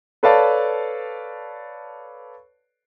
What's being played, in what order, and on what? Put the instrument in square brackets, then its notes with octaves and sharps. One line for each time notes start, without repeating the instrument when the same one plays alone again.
[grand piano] A4 B4 C#5 D5 F5 A5